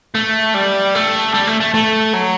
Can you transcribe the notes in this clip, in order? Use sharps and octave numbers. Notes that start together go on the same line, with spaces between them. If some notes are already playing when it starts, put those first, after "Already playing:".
A3
G3
A3
G3
A3
A3
A3
F#3